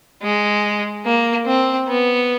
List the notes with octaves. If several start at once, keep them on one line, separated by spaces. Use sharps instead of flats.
G#3
A#3
C4
B3